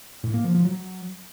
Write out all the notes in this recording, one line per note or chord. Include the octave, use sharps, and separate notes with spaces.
A2
A#3
F3
F3
F#3